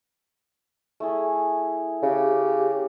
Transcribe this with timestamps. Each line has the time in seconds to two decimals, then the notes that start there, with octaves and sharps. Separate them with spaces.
1.00 A3 E4 G#4
2.02 C#3 G4